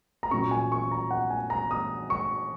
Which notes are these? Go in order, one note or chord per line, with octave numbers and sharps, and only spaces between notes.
A#5
A#2 F#3 C#4 C#6
G#5
C#6
A#5
F#5
G#5
A#5
D#6
C#6